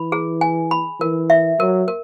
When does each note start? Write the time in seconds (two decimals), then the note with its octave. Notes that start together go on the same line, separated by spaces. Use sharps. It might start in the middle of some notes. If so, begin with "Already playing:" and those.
Already playing: E3 B5
0.12 G#4
0.41 G#5
0.71 B5
1.00 E3 A#4
1.30 E5
1.59 F#3 A#4
1.88 A#4